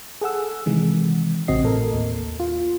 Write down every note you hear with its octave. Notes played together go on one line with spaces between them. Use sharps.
G#4 A4 F#5 E6
C3 D#3 E3 G#3
A1 C3 C4 F#4 D#5 C7
A2 A4 A#4
D#2 A#3
F4